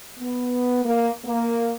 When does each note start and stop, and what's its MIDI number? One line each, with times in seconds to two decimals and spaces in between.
0.19 0.84 59
0.85 1.09 58
1.25 1.74 58